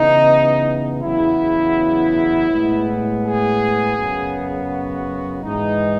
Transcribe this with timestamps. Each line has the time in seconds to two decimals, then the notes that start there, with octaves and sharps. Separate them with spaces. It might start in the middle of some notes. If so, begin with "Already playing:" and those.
Already playing: C#3 E3 B3 D#4
1.02 E2 C#3 F#3 B3 E4
2.49 A2 G#3 B3
3.22 G#4
3.96 F#2 C#3 F#3 B3
4.69 F#4
5.42 G#2 E3 G#3 B3 D#4